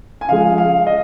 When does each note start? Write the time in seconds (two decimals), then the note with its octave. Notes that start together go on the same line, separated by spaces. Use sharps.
0.21 G#5
0.28 C#3 F3 G#3 F5
0.58 F5
0.87 D#5